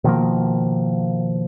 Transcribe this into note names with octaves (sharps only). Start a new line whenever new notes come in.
B2 D#3 F3 A#3